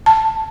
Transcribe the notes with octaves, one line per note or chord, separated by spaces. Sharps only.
A5